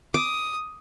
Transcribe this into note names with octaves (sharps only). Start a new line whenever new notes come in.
D6 D#6